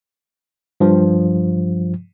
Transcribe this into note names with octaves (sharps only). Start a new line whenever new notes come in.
G2 F3